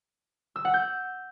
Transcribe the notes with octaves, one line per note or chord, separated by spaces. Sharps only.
E6
F#5
G6